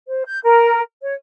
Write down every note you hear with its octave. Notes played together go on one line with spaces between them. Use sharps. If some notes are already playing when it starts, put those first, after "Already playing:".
C5
G6
A#4
C#5